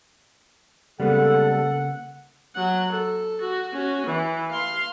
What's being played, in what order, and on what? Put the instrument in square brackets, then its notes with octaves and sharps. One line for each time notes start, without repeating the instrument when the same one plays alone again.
[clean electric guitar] C#3 A#3 [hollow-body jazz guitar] G3 G#3 B3 [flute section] A4 [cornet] F#5
[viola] F#3 F#5
A4
F#4
C#4 F#4
E3
F5 C6